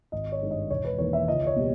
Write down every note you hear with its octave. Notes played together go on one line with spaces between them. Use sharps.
G#1 D#5
C#5
G2 D#3 G#3
D#5
E1 C#5
B4
E2 D#3 A#3 C#5
E5
C#2 D#5
C#5
B2 G3 A#3